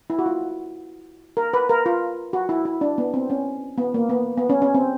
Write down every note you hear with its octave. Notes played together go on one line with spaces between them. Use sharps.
E4
F#4
F4
A#4
B4
A#4
F4
F#4
E4
E4
D4
B3
C4
C#4
B3
A#3
B3
B3
C#4
C#4
C4